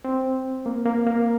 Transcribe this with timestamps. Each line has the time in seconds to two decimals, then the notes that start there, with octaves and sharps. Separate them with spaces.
0.05 C4
0.66 A#3
0.86 A#3
1.06 A#3